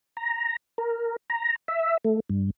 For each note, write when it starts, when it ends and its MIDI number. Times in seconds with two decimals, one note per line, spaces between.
0.17 0.56 82
0.78 1.16 70
1.30 1.56 82
1.68 1.97 76
2.04 2.20 57
2.29 2.50 43